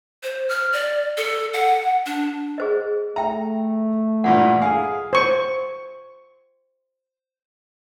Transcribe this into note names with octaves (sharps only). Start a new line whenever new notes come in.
C5
F6
D5
A4
F#5
D4
G#4 C5 D#5
A3 E5 G5 A#5
G2 A#2 E3 F#5
G#4 F5 G#5
C5 C#6